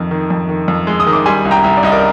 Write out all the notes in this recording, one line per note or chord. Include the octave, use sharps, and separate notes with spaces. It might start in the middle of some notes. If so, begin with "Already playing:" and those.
Already playing: F2 D#3
D#3
F2
D#3
F2
G#3
D#6
D#3
D6
G3 G#5 C6
C2
G5 A#5
C2
D5
C2 D#5
A#4 D5